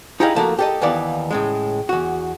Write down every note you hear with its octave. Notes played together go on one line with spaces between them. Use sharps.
D#4 E4 G4 G#4 D#5 F5
F3 A3 A#3 F#4
G4 A4 D#5
D#2 D#3 E3 B3 D5 F5
A2 C#3 G#3
E2 F#4